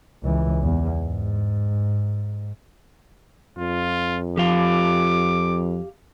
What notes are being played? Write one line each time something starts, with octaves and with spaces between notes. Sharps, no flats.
C#2 E3
E2
G#2
F2 F4
F3 G4 F5 D6